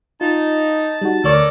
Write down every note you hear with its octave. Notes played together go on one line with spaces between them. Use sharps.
D#4 F4 A5
G3 D#4 F#4
D2 A4 A#4 C#5 D5